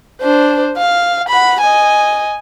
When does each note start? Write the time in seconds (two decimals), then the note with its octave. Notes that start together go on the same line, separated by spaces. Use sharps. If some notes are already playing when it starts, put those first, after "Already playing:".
0.22 D4 C5
0.77 F5
1.29 F#5 B5
1.61 D#5 G#5